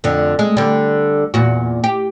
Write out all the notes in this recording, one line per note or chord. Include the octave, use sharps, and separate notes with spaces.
F2 D3
G#3
D3 G3
E2 A#2 F#4
G4